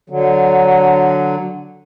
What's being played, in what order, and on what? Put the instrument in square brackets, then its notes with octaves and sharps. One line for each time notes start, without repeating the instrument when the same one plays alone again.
[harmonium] D3 F#3